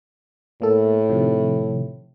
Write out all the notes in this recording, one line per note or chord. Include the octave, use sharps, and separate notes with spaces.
A2 A#3 A4
C3 D#3 F3